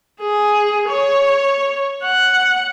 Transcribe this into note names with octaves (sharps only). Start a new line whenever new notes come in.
G#4
C#5
F#5